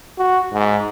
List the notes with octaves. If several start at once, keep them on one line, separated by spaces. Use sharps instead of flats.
F#4
G#2